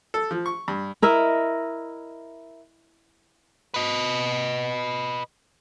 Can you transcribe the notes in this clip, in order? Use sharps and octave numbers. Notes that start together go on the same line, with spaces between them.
A4
F3
C#6
G2
E4 A#4 D#5 E5
B4 D#5